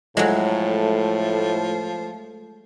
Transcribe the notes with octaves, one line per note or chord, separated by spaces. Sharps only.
A2 F3 F#3 G#3 A3